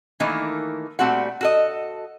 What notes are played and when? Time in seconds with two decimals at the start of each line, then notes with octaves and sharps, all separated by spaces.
0.20 D#3 E3 A3 A#3 D#4
0.99 A#2 G3 A3 C4 F#4 F#5
1.41 F#4 A4 D#5